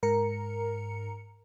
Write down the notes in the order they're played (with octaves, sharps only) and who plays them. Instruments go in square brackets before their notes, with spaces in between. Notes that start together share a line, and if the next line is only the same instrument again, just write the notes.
[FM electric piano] G#2 A#4 A#5 C#7